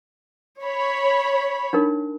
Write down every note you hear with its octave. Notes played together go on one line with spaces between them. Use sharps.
C#5 B5
D4 D#4 A#4